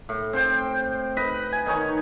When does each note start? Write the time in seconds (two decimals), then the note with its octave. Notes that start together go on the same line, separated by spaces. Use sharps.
0.09 A2
0.33 C4 C5 G5
1.17 B4 D#5 B5
1.52 G#5
1.66 D#3 D#4 C#5 G#5